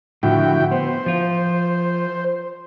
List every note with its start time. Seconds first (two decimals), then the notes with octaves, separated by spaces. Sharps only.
0.23 A2 D3 F3 E4 F#4 G5
0.72 B3 C5
1.06 F3 F4